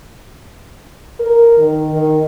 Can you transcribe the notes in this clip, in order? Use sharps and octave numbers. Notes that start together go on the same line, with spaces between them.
A#4
D#3
D#3